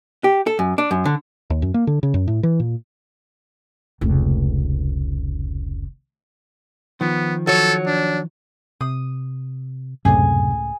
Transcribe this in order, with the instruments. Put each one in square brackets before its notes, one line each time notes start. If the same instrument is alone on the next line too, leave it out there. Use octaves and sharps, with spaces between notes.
[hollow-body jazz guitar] G4
A4
F#2
D4
F#2
D3
[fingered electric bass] D#2
F#2
A#3
D3
C#3
F#2
A2
E3
A#2
[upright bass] F1 C#2
[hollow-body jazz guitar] D#3 F3 [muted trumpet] B3
[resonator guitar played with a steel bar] F#3 C#5 [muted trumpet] A4
[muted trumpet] D4
[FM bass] C3 [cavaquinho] D#6
[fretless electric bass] C#2 A2 [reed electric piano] F#2 [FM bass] C3 [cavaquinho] G#4